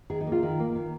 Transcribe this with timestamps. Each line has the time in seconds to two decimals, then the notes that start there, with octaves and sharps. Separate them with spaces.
0.10 D#3 G#4
0.21 D#4
0.27 A#3
0.32 F4
0.43 D#3
0.60 A#3
0.75 D#3